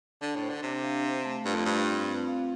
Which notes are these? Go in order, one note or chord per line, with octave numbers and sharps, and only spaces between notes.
D3 D4
A2
C5
D3
C3 D4
F5
C5
A3
G2 F4
F2
G2 F4
C4
C4
F5